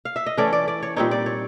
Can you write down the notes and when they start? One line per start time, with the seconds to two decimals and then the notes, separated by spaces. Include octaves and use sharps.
0.05 F5
0.16 E5
0.26 D#5
0.38 E3 A3 C#4 D5
0.53 D5
0.68 D5
0.83 C#5
0.96 A#2 G3 C4 D#4 C#5
1.11 D5
1.26 C#5